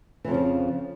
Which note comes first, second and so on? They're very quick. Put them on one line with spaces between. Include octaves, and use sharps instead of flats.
E3 F2 C#3 F3